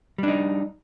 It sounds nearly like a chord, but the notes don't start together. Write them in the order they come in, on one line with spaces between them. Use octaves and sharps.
G3 D4 D#4